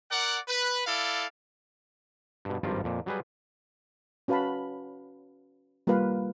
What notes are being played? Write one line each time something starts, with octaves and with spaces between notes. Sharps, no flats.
A#4 D5 F#5
B4
E4 A4 D5 F5
G2 B2
G#1 G2 F3 G3 F4 A#4
F2 A#2
F#3 G3 G#4 B4
C#4 F#4 B4 F5 A5 B5
G3 A#3 F4 A#4 B4 F5